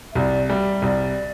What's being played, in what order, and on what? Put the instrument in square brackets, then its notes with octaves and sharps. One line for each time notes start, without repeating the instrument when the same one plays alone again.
[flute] E5
[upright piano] C2 [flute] D5
[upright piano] G3 [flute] E5
[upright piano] C2 [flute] D5